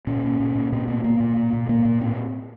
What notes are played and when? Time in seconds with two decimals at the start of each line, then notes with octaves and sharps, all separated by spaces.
0.07 A#2 C#4
0.24 A#2
0.40 A#2
0.55 A#2
0.72 A#2 C4
0.88 A#2 B3
1.04 A#2 A#3
1.20 A#2
1.37 A#2
1.53 A#2
1.69 A#2 A#3
1.85 A#2
2.01 A2 C4